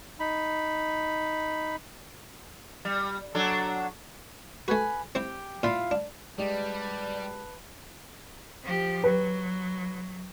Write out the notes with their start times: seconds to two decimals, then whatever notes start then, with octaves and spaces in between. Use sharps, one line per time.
0.20 D#4 B5
2.85 G3
3.35 F#3 D4 A4
4.68 A3 F#4 B4 G#5
5.15 C4 E4 G4
5.63 A#2 E4 F4 F5
5.91 D4
6.38 G3 G#3 G4 B4 D5 A5
8.63 F3 G4
9.04 F#3 B4